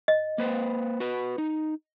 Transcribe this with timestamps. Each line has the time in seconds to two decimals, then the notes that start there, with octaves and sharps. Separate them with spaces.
0.08 D#5
0.38 A#3 B4 C5
1.00 F#4 B4
1.38 D#4